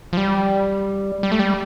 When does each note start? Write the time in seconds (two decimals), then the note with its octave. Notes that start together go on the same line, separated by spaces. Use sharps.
0.13 F3
0.17 G3
1.23 G3
1.32 A3
1.39 G3